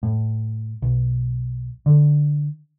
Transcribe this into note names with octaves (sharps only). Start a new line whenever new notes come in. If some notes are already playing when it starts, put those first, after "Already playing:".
A2
B1
D3